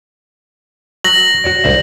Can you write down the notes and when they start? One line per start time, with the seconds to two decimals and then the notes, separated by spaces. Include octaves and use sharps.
1.04 F#3 A#6 F#7
1.44 F#4 C#5 D5
1.64 C2 C5 E5